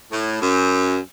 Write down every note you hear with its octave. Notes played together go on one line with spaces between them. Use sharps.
A2
F#2